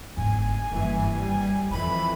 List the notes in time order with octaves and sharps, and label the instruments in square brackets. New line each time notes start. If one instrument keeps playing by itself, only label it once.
[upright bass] G1 G#2 [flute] G#5
[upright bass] F#1 [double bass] G2 E3
[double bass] G3
[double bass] F2 E3 [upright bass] E4 [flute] B5